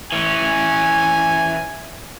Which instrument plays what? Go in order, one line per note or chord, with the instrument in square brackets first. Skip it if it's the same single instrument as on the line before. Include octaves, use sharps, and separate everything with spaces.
[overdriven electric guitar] E3 C#4 [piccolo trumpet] G#5